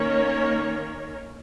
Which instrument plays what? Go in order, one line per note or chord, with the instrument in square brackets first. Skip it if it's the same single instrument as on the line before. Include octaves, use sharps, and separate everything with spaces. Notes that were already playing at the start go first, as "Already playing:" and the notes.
Already playing: [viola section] D#3 A#3 C#4 A#4 C#5